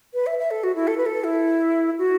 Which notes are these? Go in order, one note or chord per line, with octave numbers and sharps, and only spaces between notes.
B4
E5
E5
A4
F#4
E4
A4
B4
A4
E4
F#4